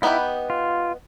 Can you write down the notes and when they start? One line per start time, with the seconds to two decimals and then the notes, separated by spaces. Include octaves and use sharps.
0.02 B3 D#4 E4 G4 B4
0.50 F4